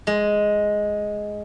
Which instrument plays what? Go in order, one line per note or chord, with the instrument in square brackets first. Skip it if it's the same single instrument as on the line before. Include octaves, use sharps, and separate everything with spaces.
[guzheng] G#3